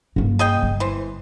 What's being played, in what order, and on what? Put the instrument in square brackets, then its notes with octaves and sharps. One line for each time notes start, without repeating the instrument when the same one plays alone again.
[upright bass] G2 A#3
[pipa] G#4 D#5 G5
[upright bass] G1
[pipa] E3 C5